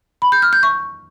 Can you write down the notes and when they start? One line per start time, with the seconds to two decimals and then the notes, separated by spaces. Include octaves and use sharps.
0.22 B5
0.32 G6
0.42 F6
0.53 G6
0.63 C#6